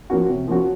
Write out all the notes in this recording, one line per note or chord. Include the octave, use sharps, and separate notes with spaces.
F3 A#3 C#4 F#4
C3
F3 A#3 C#4 F#4